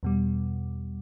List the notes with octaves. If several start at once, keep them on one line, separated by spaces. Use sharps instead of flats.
E2 B2 G3